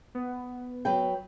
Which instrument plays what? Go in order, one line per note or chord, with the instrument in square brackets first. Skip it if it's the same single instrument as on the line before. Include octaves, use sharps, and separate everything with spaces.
[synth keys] B3
[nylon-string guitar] F#3 B4 G5